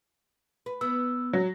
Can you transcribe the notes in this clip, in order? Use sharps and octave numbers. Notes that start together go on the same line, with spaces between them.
B4
B3 E6
F#3